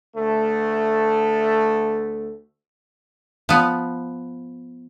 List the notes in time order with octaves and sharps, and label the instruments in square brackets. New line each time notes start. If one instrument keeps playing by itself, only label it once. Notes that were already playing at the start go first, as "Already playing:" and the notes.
[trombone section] D2 A3
[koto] F3 B3